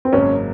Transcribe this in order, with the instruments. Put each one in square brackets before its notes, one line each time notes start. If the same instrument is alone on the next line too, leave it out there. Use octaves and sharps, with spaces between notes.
[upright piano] C4
[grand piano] G#1 F#2 C#3 F#3 A#3 [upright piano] C#4